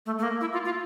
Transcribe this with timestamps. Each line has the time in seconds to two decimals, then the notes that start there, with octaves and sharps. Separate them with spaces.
0.06 A3
0.19 A3
0.23 A#3
0.41 E4
0.53 F4
0.65 F4